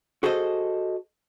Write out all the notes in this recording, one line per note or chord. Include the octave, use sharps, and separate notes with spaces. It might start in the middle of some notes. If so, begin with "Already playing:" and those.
F#4 G#4 A4 C5 D#5